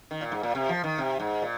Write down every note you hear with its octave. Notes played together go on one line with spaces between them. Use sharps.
D#3
A#2
G#2
A#2
C3
F3
D#3
C3
G#2
A#2